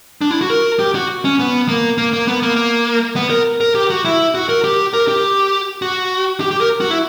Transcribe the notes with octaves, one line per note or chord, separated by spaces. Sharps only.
D4
E4
F#4
A#4
G4
F#4
C#4
B3
A#3
A#3
A#3
B3
A#3
A#3
B3
A#4
A#4
G4
F#4
E4
F#4
A#4
G4
A#4
G4
F#4
G4
G4
A#4
F#4
E4